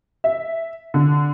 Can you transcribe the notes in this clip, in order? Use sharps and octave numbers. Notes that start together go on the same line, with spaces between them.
E5
D3